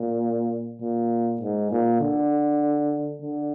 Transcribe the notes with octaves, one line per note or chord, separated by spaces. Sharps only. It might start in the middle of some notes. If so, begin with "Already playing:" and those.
Already playing: A#2
A#2
G#2
A#2
D3
D3